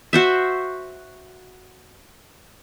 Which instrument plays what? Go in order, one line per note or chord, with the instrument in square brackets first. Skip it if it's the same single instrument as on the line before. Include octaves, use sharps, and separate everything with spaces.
[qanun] F#4 C5 E5